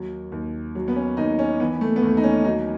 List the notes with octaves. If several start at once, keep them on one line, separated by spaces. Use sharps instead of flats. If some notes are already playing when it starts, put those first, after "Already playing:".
Already playing: D#2 F#3
D#2
F#3
B3
C#4
D#2 D#4
C#4
E3 B3
A3
B3
D#2 A3
D#4
C#4
F#3 D#4